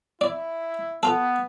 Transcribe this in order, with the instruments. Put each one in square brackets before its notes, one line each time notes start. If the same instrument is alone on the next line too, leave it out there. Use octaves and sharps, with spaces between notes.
[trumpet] E4 [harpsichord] D5
[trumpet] B3 [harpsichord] F4 A4